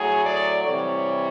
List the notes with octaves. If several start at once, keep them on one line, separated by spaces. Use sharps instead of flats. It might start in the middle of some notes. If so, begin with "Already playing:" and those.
Already playing: A2 F#3 A3 G#4
D5
C3 E3 G3 C#5